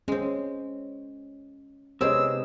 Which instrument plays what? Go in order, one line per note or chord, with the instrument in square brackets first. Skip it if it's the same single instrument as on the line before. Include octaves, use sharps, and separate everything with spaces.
[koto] G#3 C4 [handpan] C#4
[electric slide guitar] C3 [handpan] G#3 B4 D#5 [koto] C4 C#4 G#4 [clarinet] E6